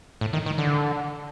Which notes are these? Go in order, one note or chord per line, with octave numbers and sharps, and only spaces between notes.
A2
D#3
D#3
D3